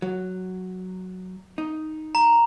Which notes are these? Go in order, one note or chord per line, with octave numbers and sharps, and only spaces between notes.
F#3
D#4
A#5